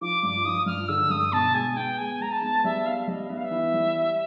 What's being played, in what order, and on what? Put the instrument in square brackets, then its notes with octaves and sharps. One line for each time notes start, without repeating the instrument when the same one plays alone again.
[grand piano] F3 [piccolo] D6
[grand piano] G2 [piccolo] D6
[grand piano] F3 [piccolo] D#6
[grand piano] G2 [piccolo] F6
[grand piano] D3 [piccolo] E6
[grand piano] G2 [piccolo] D#6
[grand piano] B2 [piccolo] A5
[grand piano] G#3 [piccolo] G#5
[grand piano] B3 [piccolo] G5
[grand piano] G#3 [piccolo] G#5
[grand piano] G#3 [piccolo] A#5
[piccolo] A5
[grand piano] B3
[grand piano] G3 [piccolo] E5
[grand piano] B3 [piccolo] F5
[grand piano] G3 [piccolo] D#5
[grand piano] B3 [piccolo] E5
[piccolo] F5
E5
[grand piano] E3
G3